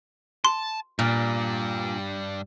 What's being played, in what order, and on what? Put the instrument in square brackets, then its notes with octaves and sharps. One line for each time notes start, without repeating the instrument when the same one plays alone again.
[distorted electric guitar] A5 [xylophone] C6
[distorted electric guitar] G2 G3 [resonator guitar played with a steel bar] A#2